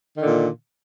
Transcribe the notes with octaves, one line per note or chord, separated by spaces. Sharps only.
A#2 D3 D#3